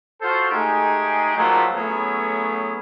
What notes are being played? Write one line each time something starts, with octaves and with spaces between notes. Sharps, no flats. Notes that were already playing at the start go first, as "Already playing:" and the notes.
F4 F#4 A4 C5
G#3 A3 D#4 G4 G#4
A#2 F3 F#3 G#3 A3 B3
F#3 A3 B3 C#4 E4 G#4